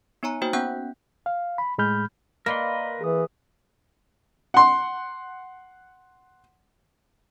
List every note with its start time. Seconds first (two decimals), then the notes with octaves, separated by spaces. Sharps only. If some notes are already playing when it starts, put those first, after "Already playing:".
0.23 B3 D#4 C#5 G#5 A#5
0.42 A#3 D#4 F#4 C5 G5
0.53 B3 C#4 F#5 G5 F#6 G6
1.26 F5
1.58 B5
1.78 A2 G#3 B5 F6 G6
2.46 A#3 A#4 B4 D5 D#5 B5 C6
3.01 E3 G#4 D#6
4.54 F#5 C6